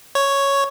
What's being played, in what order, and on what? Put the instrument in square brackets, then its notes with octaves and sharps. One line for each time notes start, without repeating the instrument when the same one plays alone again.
[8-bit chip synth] C#5